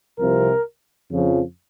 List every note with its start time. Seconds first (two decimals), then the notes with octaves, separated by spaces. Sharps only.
0.19 C2 C3 F3 A#4
1.10 F2 C#3 F3